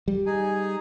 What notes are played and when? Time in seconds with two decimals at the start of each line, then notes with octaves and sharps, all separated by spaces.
0.08 G3
0.26 D#4 G#4 G#5